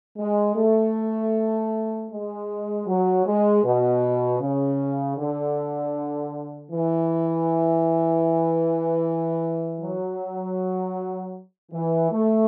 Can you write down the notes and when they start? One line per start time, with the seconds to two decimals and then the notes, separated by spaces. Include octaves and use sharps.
0.18 G#3
0.56 A3
2.10 G#3
2.87 F#3
3.26 G#3
3.64 B2
4.41 C#3
5.17 D3
6.72 E3
9.80 F#3
11.72 E3
12.11 A3